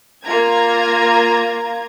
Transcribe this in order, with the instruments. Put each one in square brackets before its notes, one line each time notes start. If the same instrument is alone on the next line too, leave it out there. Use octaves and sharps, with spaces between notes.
[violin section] A#3 F4 A#5 G#6